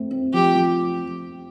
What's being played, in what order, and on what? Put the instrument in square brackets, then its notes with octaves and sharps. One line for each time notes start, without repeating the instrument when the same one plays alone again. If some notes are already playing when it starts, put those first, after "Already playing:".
Already playing: [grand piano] A3 C4
C4
[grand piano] F3 [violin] G4
[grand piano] F3